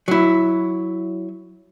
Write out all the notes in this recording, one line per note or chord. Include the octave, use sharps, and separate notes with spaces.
F#3 E4